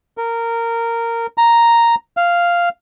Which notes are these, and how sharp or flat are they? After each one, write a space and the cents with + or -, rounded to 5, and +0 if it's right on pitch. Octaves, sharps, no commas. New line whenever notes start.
A#4 -15
A#5 +0
F5 -5